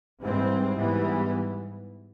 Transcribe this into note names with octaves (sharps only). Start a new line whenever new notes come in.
G#2 E3 G3 C4
G#2 E3 G3 B3